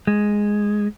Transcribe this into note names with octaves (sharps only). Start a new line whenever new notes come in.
G#3